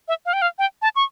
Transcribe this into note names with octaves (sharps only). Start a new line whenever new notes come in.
E5
F5
G5
F5
G5
A5
C#6